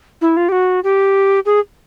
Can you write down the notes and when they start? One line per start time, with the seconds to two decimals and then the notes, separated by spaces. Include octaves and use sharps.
0.21 E4
0.37 F4
0.49 G4
0.52 F#4
0.84 G4
1.46 G#4